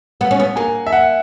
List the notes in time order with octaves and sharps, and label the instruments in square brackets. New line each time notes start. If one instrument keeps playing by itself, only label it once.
[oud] B3 [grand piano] F#5
[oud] C#4
B3
[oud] A#3 [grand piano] G#5
[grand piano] E5
F#5